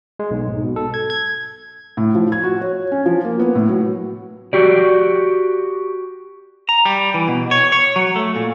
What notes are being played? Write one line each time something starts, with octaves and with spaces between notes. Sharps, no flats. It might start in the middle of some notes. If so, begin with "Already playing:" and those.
G#3
B1
G#2
B2
A4
G#6
G#6
A2
F3
G#6
F#4
C#5
C#4
F3
A#3
B3
A2
F#3
F#4 G4 D5
A#5
G3
E3
B2
C#5
C#5
F#3
A3
A#2